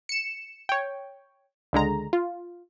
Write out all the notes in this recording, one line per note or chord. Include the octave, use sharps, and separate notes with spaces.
C#7 E7
C#5 G5
C#2 D3 G#3 A#5
F4